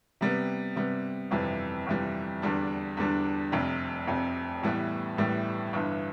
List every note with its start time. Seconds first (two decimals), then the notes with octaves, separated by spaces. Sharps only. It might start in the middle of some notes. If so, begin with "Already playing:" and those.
0.21 C3 G3 B3
0.76 C3 G3 B3
1.31 G1 F2 C3 E3 G3
1.87 G1 F2 C3 E3 G3
2.42 E2 D3 G3 D4
2.97 E2 D3 G3 D4
3.52 F1 F2 C3
4.07 F1 F2 C3
4.62 A1 A2 E3 G3 B3
5.17 A1 A2 E3 G3 B3
5.73 G1 G2 E3